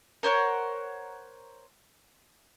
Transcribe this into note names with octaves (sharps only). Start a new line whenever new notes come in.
A#4 C5 C#5 F#5